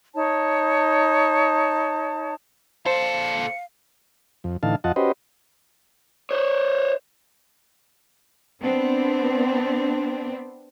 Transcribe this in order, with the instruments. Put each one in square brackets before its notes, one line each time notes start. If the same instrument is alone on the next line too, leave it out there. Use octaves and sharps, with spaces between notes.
[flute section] D#4 C#5 A5
[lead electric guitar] A#2 A4 [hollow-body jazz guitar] C5 [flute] F5 [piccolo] C#7
[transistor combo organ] F2
A2 D3 E3 D#4 F5 A5
F2 F4 D#5 F#5 A5
C#4 F#4 G4 B4 C5 D#5
[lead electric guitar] C5 C#5
[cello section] B3 C4 D4